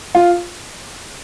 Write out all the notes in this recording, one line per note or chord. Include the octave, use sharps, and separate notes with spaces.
F4